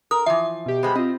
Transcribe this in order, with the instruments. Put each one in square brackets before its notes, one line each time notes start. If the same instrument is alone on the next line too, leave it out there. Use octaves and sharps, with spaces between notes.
[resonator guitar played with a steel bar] A#4 [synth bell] D#6
[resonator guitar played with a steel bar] E3 F3 [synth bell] E5
[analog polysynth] B2 G4
[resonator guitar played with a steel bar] G3 G#3 B3 [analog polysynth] C5 B5
[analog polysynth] C4 F4 [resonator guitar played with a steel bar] D#5